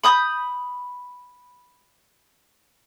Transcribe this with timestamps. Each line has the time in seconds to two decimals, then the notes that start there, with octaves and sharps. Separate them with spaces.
0.04 B5 D#6 G6